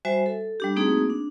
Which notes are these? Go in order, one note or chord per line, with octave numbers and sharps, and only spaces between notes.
G3 F#4 C5 E5 G#5
A4
G3 D4 G4
A3 A#3 C4 D#4 F#4 G#4
D4